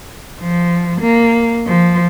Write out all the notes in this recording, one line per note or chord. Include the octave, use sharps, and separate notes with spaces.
F3
A#3
F3